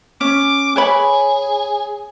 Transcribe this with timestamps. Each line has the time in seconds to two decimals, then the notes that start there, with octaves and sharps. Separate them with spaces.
0.21 C#4 D6
0.76 G#4 B4 C#5 B5